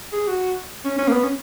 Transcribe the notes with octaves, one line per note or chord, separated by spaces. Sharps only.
G#4
F#4
C#4
C#4
A#3
B3
C#4